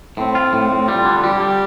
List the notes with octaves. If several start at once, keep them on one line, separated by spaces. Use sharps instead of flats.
A2 C4
F4
A2
A2
G3 F4
D3
G3 G4
G3